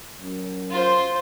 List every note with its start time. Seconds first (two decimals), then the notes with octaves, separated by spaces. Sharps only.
0.19 F#2
0.70 F4 C5